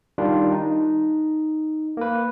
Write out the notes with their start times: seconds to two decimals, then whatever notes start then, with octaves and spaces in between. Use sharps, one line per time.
0.18 D#3 G3 D4 F4
0.52 D#4
1.97 A#3 B4